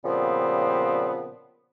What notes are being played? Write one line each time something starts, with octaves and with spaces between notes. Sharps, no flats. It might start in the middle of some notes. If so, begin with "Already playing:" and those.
A#2 C#3 F3 G3 B3 C4